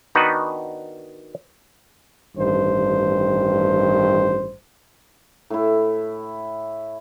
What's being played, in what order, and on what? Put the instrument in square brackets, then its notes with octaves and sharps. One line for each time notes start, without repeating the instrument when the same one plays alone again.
[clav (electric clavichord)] D#3 B3 D4 D#4 F#4 B4
[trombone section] A1 G2 D#3 C5
[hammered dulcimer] A2 E4